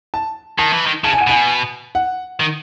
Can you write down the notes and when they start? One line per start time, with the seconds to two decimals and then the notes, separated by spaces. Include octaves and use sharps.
0.14 A5
0.59 D#3 A5
0.73 E3
0.86 D#3
1.04 C#3 A5
1.13 G#5
1.21 F#5
1.27 B2 G#5
1.95 F#5
2.40 D#3